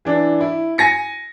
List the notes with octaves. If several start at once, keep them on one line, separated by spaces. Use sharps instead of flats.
E3 D4
E4
G#5 A#6 C#7